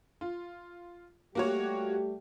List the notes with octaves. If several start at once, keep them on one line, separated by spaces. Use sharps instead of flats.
F4
G3 A3 A#3 F#4 G4 C#5